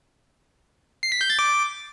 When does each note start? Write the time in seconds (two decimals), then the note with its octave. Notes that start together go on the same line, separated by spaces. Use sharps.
1.03 C7
1.12 B6
1.21 G6
1.30 A6
1.39 D6